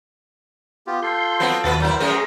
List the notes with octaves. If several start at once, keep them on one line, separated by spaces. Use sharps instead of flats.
B3 F4 G4
F4 A4 C6 G6
F#3 B3 C4
D#2 B2 F#4 B4 A6
F#3 E4 A#4 C5
F#2 A3 C#4 G#4 A#5